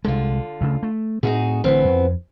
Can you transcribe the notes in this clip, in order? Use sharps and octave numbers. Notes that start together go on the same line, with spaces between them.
C2 D3 G#3 F4
D2 C#3 A3
A3
A2 C4 D#4 F#4 G#4
A1 D3 E3 B3 C4
F2